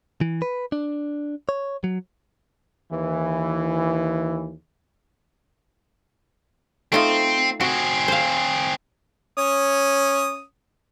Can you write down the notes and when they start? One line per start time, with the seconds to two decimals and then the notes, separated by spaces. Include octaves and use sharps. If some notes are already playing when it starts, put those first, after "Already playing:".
0.21 E3
0.42 B4
0.72 D4
1.49 C#5
1.84 F#3
2.92 D#2 E3
6.92 A3 C4 D#4 F4
7.61 C4 F#4 G#4
8.08 C5 F5
9.37 C#4 C#5 D#6